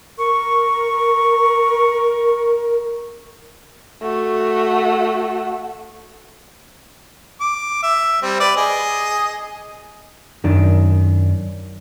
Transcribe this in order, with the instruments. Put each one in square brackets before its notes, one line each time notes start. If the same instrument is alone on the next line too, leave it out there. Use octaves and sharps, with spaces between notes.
[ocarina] A#4 [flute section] C#6
[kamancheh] A3 F#4
[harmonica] D6
E5
G3 C4
B4 D5
G#4 D#5
[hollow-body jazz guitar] F#2 D#3 D4